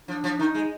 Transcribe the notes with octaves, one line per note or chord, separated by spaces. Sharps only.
F3 D4
F3
D#3 D#4
G#3